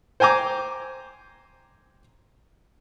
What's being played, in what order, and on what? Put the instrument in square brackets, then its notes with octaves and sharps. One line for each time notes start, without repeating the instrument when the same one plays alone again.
[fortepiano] C5 G5 G#5 A#5 D6